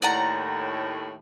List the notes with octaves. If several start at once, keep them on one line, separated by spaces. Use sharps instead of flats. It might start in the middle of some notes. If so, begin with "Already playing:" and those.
D#2 A2 D5 F#5 A#5